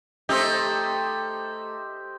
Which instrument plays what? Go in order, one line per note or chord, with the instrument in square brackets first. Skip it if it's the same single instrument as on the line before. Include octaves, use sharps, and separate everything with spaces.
[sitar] A3 D#4 [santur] G4 C5 D#5